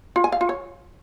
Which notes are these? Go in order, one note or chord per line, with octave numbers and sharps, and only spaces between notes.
F4
G#5
F5
F4
C#5